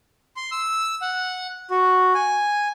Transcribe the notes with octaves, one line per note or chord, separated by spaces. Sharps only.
C6
E6
F#5
F#4
G#5